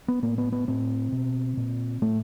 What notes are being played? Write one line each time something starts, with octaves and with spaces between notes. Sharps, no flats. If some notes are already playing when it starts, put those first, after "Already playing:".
B3
A2 A#3
B3
B3
A2 C4
B2
A#2
A2 A3